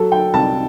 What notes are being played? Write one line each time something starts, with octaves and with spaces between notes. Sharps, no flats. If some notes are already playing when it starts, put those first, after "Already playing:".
Already playing: F#3 A4
G5
C2 A5